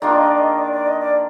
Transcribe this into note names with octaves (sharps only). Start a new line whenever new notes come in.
D#3 A#3 D4 F4 D5
D#5
D5
D#5
D5
D5
D#5
D5